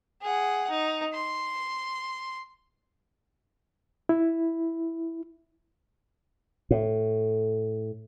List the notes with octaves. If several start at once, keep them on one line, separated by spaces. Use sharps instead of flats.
G#4 F#5
D#4
C6
E4
A2